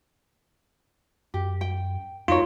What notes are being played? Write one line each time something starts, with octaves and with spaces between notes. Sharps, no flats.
F#2 G4
G5
F2 D#4 F4 A#4 C#5